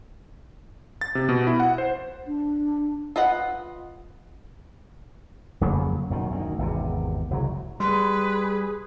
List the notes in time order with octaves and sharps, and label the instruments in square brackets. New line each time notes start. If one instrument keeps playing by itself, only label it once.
[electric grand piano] A6
C3
B2
E4
F#5
C5
[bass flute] D4
[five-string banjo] F4 B4 D#5 F#5
[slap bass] F2 C#3 F#3 A#3
F#2 B2 D#3
D2 D#3
G#1 E2 C3
F#1 C2 F#3
[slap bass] G3 [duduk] G#4 [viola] B4 [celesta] C6